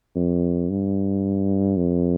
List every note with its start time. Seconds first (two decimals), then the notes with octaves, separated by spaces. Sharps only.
0.15 F2
0.70 G2
1.77 F2